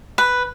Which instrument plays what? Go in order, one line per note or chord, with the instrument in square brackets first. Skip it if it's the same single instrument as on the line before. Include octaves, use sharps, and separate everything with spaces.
[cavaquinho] B4